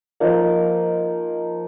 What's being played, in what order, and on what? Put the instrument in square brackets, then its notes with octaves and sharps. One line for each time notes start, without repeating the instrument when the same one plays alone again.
[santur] F3 A#3 D#4 A#4